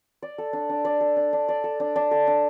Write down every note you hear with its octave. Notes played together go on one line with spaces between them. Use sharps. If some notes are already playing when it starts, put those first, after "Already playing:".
D5
A4
D4
D4
D5
A4
D4
D4
D5
A4
D4
D4
A4
D4